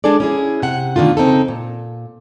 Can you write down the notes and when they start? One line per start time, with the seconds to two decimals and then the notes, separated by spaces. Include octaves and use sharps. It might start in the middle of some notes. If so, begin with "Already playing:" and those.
0.04 G#3 D4 G#4 A4 D5
0.20 C#4 E4 G#4
0.62 C3 F#5
0.96 B2 D3 D#3 A3 F4
1.17 C#3 C4 D#4 A4
1.48 A#2